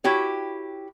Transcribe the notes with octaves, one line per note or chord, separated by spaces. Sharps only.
E4 F#4 G4 C#5